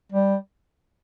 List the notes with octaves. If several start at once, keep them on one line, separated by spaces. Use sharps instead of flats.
G3